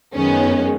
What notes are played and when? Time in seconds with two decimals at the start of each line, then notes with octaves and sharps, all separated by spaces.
0.15 F#2 D#3 G#3 B3 C#4